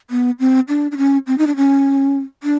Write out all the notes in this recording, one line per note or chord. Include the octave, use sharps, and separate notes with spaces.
B3
C4
D4
D4
C#4
C4
D#4
D4
C#4
D4